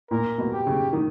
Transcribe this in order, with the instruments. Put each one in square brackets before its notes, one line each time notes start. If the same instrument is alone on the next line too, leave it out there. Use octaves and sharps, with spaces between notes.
[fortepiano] A#2 [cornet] A#4
[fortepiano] B2
[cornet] G4
[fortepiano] C#3
D#3